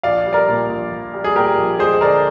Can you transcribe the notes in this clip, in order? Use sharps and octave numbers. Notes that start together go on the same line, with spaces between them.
A#1 D5 F5
G3
A#4 D5
A#2
A#1
A#1
G3
G#4
A#2 G4 A#4
A#1
G#3 G#4 C5
D3 A#4 D5